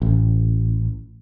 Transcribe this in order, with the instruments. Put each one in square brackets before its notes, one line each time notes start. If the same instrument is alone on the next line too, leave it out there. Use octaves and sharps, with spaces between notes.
[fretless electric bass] A1